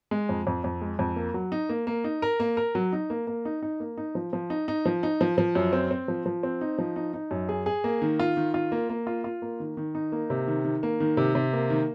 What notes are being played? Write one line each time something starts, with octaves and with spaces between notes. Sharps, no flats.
G#3
F2
F2
F2
G#3
F2
A#3
F#3
D#4
A#3
A#3
D#4
A#4
A#3
A#4
F#3
D#4
A#3
A#3
D#4
D#4
A#3
D#4
F3
F3
D#4
D#4
F3
D#4
F3
F3
F#2
C4
C4
F3
F3
C4
D#4
F3
D#4
D#4
F#2
G#4
G#4
A#3
D#3
F4
D#3
F4
A#3
A#3
F4
F4
A#3
D#3
D#3
D#4
A#3
C3
D#3
D#3
A#3
D#3
C3
C3
A#3
D#3